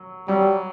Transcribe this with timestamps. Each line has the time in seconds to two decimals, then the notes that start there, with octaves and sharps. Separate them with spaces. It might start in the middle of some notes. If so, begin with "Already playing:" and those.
Already playing: F#3
0.28 F#3 G3